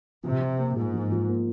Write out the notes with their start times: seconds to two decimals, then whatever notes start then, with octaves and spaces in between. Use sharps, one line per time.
0.23 C3 F3
0.40 F3
0.59 A#3
0.76 G#2 F4
0.93 F3
1.12 F3
1.29 A#3